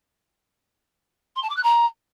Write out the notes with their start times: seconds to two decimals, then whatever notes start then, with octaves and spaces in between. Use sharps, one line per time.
1.36 C6
1.43 A5
1.50 D6
1.56 F#6
1.63 A#5